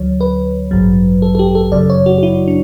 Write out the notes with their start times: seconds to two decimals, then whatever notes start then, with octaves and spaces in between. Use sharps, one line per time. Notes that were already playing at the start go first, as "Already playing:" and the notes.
Already playing: D2 D3 F#3 C#5
0.21 B4
0.71 A1 G2 F#3
1.22 A4
1.35 A4
1.39 G4
1.55 A4
1.72 G1 F#2 C#3 F#3 D5
1.90 C#5
2.06 F#4
2.18 F#4
2.23 E4
2.48 D4